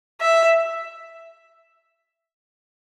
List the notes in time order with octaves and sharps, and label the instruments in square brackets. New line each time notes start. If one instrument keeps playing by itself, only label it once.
[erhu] E5